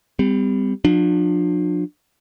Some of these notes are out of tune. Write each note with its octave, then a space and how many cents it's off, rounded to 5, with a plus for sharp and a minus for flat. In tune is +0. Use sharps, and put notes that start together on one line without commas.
G3 +15 C4 -40
F3 +35 D4 +30